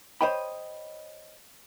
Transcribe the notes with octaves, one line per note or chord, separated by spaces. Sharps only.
C5 C#5 D#5 G5 B5